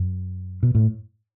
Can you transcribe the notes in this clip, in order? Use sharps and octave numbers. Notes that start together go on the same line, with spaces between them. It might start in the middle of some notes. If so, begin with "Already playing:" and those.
Already playing: F#2
B2
A2